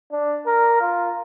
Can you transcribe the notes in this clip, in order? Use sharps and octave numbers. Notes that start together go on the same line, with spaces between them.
D4
A#4
F4